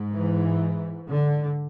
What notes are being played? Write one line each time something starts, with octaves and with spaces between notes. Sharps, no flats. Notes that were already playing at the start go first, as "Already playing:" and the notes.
Already playing: G#2
E3
D3